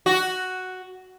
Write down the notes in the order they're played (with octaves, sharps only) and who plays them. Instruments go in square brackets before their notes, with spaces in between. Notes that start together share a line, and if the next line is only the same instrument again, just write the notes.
[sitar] F#4